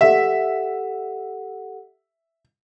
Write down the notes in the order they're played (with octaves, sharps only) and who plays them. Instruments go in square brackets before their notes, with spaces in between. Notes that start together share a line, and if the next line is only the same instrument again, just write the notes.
[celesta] G4 A4 F#5 [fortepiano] E5